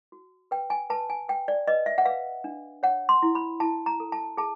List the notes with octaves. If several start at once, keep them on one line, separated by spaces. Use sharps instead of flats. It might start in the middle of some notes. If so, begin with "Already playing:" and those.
F#4
B4 G5
G#5
B4 A5
G#5
B4 G5
D5
B4 D#5
E5
F#5
B4 F5
D4
C#5 F#5
C6
E4
B5
E4 A5
A#5
A4
A5
G#4 A5